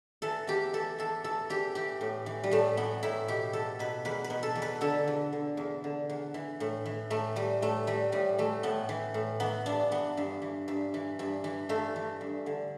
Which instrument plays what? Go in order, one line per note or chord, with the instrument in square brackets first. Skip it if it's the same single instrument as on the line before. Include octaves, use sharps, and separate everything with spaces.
[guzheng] E3 A4
E2 G4
E3 A4
E2 A4
E3 A4
E2 G4
E3 G4
A2
E3
G3
A2 A3
E3 B3
A2 E4
B2 G4
E2 A4
B2 B4
E2 B4
B4
B2
A4
E2
B4
D3 A4
E2
D3
E2
D3
E2
E3
A2
E3
A2 A3
E3 G3
A2 A3
E3 G3
A2 G3
E3 A3
A2 B3
E3
A2
E3 B3
G2 D4
E3 B3
G2
E3
G2
E3
G2
E3
G2 A3
E3
G2
D3